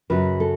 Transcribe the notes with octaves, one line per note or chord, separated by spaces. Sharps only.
F#2 C#3 F#3 B4
A4